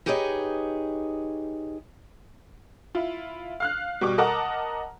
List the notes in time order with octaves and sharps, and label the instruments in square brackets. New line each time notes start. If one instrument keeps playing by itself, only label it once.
[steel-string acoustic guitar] D#4 G4 G#4 B4 C#5 D#5
[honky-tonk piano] E4 F4
F5 F6 F#6
B2 G3 C#6 D6
A#4 D#5 F#5 A5 A#5 D6